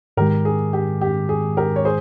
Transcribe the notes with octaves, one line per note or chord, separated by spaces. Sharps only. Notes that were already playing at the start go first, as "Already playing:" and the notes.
G#2 D#3 G#3 G4 A#4
G#4
G4
G4
G#4
G4 A#4
C#5
G#4 C5